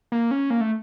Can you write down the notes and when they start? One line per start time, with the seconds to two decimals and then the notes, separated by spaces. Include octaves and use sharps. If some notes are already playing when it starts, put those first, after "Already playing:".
0.12 A#3
0.31 C#4
0.50 A#3
0.61 A3